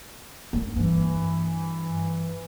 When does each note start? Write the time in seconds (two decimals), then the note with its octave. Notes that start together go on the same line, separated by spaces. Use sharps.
0.53 A#3 C#4
0.76 G2 E3